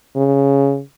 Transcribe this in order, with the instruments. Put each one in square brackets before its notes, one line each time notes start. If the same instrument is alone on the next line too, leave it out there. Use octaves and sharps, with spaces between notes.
[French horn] C#3